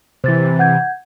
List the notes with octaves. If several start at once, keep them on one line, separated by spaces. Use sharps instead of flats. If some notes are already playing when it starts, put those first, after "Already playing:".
C3 E3 C5 A6
F#5 G6 G#6